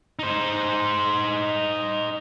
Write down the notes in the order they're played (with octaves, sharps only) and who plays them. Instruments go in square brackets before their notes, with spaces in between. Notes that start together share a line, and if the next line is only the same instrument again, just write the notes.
[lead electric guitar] D#4 C5